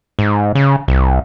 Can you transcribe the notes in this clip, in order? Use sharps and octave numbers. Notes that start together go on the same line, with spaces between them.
G#2
C#3
C2